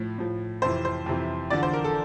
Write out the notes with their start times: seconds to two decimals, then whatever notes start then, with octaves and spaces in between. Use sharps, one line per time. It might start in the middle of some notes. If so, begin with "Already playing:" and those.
Already playing: A2 F3
0.18 A2 F3
0.62 F2 C3 E3 C5
0.85 C5
1.06 F2 C3 E3
1.50 E2 D3 F3 D5
1.63 C5
1.73 A#4
1.84 A4